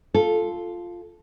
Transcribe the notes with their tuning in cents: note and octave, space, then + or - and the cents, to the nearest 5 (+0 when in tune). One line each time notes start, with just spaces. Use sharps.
F4 +0 A4 -10